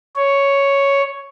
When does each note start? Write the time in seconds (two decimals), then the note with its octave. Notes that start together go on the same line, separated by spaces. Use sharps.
0.16 C#5